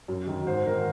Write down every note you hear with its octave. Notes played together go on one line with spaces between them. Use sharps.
F#2
D#3
G#2 C5
D#3 A#4